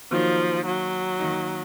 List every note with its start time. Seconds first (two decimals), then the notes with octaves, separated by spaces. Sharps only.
0.11 D#3 F3 F#3 A#3 D#4
0.66 F#3
1.19 D#3 A#3 D#4